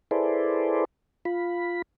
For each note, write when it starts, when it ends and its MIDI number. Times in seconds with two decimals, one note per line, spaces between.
0.11 0.85 64
0.11 0.85 68
0.11 0.85 69
0.11 0.85 71
0.11 0.85 72
0.11 0.85 74
1.25 1.82 65
1.25 1.82 83